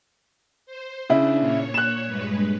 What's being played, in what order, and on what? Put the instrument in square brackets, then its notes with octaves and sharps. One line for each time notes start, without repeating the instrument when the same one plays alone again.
[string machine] C5
[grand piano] C#3 E4 [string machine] D4
[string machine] A#2 C#5
[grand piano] F#6 E7
[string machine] G2 G#3 B4